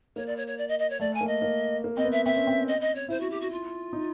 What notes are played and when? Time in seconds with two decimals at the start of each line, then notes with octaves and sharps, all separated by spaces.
0.16 A#3 C#5
0.26 D5
0.37 C#5
0.47 C#5
0.58 D5
0.68 D#5
0.79 D#5
0.90 C#5
1.00 A3 D5
1.14 G#5
1.21 A#3
1.27 D#5
1.42 A#3
1.84 A#3
1.97 C4 D#5
2.04 B3
2.11 E5
2.25 C4 E5
2.36 C#4
2.47 C4
2.67 D#5
2.81 D#5
2.95 C#5
3.09 E4 C5
3.20 F#4
3.30 G4
3.41 F#4
3.51 F4
3.93 D#4